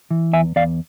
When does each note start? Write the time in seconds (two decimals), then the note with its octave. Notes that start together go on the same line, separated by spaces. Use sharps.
0.11 E3
0.33 E2 E5 G#5
0.56 E2 D5 F5